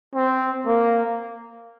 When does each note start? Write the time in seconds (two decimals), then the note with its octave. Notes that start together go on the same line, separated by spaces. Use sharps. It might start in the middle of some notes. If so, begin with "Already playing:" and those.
0.15 C4
0.66 A#3